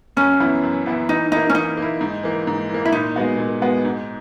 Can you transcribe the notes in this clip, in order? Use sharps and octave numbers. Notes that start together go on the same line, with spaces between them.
F#2 C#4
E3 B3 E4
F#2
E3 B3 E4
E3 D#4
A#3 D#4 E4
C#4
E3 D#4
A#3 E4
G#2
E3 A#3
G#2
E3 A#3
E4
A#2 D#4
G#3 B3 F#4
A#2
G#3 B3 F#4
G#2